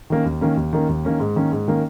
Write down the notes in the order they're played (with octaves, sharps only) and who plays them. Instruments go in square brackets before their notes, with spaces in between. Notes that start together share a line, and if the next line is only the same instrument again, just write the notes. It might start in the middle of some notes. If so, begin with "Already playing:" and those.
[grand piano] D#3 A#3 C#4
D#2
D#3 A#3 C#4
D#2
D#3 A#3 C#4
D#2
D#3 A#3 C#4
G#2
D#3 A#3 C#4
G#2
D#3 A#3 C#4